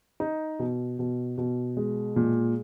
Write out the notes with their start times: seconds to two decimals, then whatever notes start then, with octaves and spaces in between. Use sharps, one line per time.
0.20 D#4
0.59 B2
0.99 B2
1.38 B2
1.77 G#3
2.16 A#2